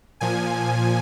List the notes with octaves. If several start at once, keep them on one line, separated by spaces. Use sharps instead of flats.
A#2 F3 G#5